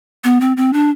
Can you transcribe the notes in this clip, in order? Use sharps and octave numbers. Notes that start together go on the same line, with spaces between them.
B3
C4
C4
D4